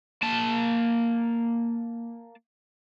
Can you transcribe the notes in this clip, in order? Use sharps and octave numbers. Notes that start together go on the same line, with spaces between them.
A#3 A5